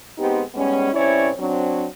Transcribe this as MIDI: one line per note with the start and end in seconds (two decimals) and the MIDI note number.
0.18 0.41 56
0.18 0.41 59
0.18 0.41 60
0.18 0.41 63
0.18 0.41 67
0.55 0.91 44
0.55 0.91 55
0.55 0.91 56
0.55 0.91 59
0.55 0.91 61
0.93 1.29 43
0.93 1.29 48
0.93 1.29 61
0.93 1.29 64
0.93 1.29 73
0.93 1.29 74
1.37 1.85 54
1.37 1.85 60
1.37 1.85 62